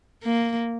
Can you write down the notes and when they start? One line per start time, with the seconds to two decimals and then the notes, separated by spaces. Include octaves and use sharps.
0.23 A#3